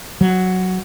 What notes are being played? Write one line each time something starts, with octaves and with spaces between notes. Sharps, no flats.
F#3